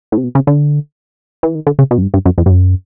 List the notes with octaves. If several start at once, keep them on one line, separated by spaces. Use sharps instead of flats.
A2
C3
B2
C#3
D3
E3
D#3
D3
C#3
B2
F#2
G2
G2
F#2
F2
G2
F#2